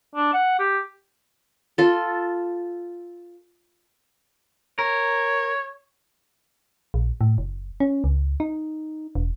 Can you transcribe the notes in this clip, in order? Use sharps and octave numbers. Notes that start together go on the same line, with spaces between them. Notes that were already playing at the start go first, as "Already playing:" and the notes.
D4
F#5
G4
F4 A4
A#4 C#5
A#1
A2
F#1
C#4
C#2
D#4
E1